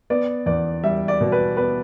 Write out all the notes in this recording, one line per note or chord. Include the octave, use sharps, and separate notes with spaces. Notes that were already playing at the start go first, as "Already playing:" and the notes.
B3 D5
E2 D5
G3 E5
D5
B2
B4
B3 B4